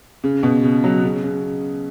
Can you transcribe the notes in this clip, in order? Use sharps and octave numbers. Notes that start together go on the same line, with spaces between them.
C#3
B2
C#3
F#3
C#3
C#3